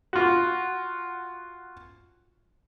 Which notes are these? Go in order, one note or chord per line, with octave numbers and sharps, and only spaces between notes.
F4 F#4